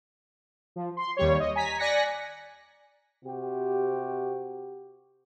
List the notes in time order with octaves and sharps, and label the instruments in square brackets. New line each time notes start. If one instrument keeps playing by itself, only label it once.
[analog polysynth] F3
C6
D#2 G3 C#5
D#5
G#5 A#5 B6
D5 G#5 F#6 A#6 B6 C#7
[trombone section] C3 F#4 G4